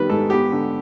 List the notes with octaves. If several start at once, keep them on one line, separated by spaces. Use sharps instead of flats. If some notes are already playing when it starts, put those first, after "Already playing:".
Already playing: A1 D#3 G3 B3 B4
G#2 A4
B3 G4
D3